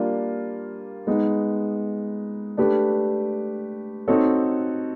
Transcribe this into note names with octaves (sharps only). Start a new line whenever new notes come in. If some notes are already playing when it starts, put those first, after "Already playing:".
Already playing: G3 A#3 D4 F4
G#3 B3 D#4
A3 D4 G4 B4
C4 D#4 F#4 A4 C#5